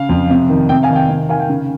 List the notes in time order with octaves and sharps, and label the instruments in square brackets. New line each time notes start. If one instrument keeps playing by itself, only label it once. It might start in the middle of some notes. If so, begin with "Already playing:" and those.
Already playing: [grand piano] C#3 F5
F2
C3
D#3
C3 G5
F5 G#5
D#3
G5
C3
D#3 F5 G#5
G5
C#3